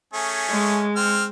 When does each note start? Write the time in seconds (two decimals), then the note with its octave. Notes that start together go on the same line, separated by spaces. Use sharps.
0.14 A3 C#4 G#4
0.49 G#3
0.96 C4 F6